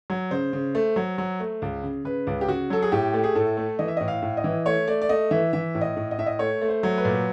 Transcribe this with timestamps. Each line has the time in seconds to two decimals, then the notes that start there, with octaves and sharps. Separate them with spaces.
0.10 F#3
0.31 C#3 C5
0.53 C#3
0.75 A3
0.96 F#3
1.18 F#3
1.40 A3
1.62 C#2
1.83 C#3
2.05 C#3 B4
2.27 C#2
2.41 G4
2.48 C#3 F#4
2.70 F#3 A4
2.82 G#4
2.92 A2 G4
3.14 A3
3.24 G#4
3.35 A2 A4
3.57 A3
3.79 E3 D#5
3.88 E5
3.97 A2 D#5
4.08 F5
4.22 A2
4.37 D#5
4.44 E3
4.66 A3 C#5
4.88 A3 D5
5.02 D5
5.09 A3 D#5
5.31 E3 E5
5.53 E3 E5
5.75 A2
5.81 D#5
5.96 A2
6.11 D#5
6.18 A2 E5
6.26 D#5
6.39 A3 C#5
6.62 A3
6.68 C5
6.83 F#3
6.98 B4
7.05 A#2